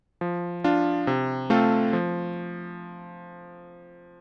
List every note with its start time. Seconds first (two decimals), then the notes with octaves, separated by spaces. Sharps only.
0.21 F3
0.64 D4 F4
1.07 C3
1.50 A3 C4 F4 A4
1.93 F3